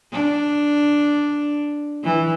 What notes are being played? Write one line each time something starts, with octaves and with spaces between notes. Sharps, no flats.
D4
E3